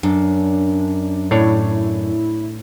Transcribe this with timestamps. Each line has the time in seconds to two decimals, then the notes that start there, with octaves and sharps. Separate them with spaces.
0.03 F#2 D4
1.31 A2 D4 E4 C#5